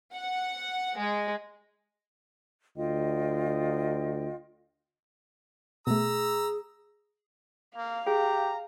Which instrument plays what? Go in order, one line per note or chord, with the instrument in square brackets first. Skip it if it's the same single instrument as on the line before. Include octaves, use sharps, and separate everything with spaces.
[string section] F#5
G#3
[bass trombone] D2 [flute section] F4 D#5 G5
[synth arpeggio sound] B2 A3 [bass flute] G#4 [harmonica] A#5 E6
[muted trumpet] A#3 [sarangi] F5
[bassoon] G4 [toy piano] G#4 [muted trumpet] A#5